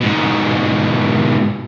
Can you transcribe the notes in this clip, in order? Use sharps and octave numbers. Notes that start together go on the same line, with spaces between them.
G#2 B2